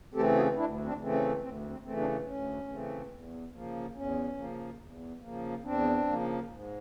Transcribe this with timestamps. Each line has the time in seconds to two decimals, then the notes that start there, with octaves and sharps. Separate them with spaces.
0.14 C#3 E3 A3 C4 G4 A4
0.35 F#4 G#4
0.56 D2 D4 E4
0.84 C4 D4
0.99 C#3 E3 A3 C4
1.13 C#4
1.41 D2 C4
1.69 C4
1.83 C#3 E3 A3 C4
1.97 C4 D4
2.26 D2 C#4
2.67 C#3 E3 A3 C4
3.11 E2
3.53 C#3 F3 A#3
3.94 E2 C#4
4.36 C#3 F3 A#3
4.79 E2
5.21 C#3 F3 A#3
5.63 E2 C4 D4
6.06 C#3 F3 A#3
6.48 G#2